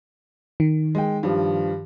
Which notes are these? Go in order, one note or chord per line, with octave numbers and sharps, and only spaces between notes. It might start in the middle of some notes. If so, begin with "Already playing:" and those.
D#3
G#3 G5
G2 F3